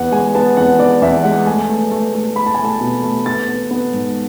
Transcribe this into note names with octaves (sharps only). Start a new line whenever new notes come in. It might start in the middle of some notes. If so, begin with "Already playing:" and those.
Already playing: E2 B3 F#5
G#3 G#5
B3 A5
E2 F#5
B3 D5
E2 E5
G#3 F#5
A3 G#5
A3
A3
A3
A3 B5
A5
G#5
A3
A5
B2
A3
B3 A6
B3
B3
G#2